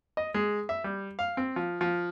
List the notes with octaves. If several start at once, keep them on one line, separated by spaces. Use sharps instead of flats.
D#5
G#3
E5
G3
F5
C4
F3
F3